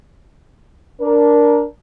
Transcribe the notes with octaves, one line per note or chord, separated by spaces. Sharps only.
D4 A#4